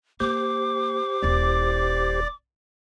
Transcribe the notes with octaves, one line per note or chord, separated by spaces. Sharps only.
A#3 G4 C5 D6
D#1 E4 D5